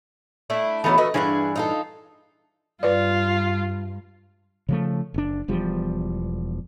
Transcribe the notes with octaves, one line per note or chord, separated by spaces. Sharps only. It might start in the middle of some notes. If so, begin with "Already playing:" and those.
A3 D4 E4
E3 F#3 A3 B3 D#4 G#4
A3 F#4 B4 D#5
G2 E3 D4 G#4 C#5 F#5
D#4 F4 A4
G2 F4 B4 D5
C#3 F3 A3
F#1 D4
E1 E2 F3 G3